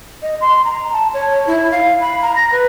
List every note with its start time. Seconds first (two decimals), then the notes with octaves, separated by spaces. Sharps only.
0.22 D#5
0.40 C6
0.64 A#5
0.93 A5
1.14 C#5
1.47 E4
1.71 F5
2.00 B5
2.22 A#5
2.36 A#6
2.51 B4